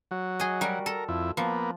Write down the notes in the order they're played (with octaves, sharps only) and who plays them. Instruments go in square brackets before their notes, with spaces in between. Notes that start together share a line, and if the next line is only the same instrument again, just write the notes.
[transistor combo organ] F#3
[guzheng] G#4 D#5
G3 F#4 A#4
[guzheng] A4 [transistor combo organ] A#4
[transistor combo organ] F2 E4
[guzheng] F3 [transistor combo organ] A#3 B3